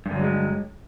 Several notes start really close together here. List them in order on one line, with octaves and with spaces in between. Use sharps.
G2 D3 F#3 G#3